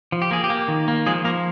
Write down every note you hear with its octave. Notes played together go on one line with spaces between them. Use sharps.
F3
G4
A#3 G#4
G4
A#3
D#3
A#3
F3 G#3 G#4
F3 A#3 A#4